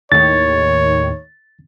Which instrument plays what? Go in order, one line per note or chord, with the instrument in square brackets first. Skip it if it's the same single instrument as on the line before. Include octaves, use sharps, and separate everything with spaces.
[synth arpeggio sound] D#2 A2 D#3 [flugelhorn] C#5 [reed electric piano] A6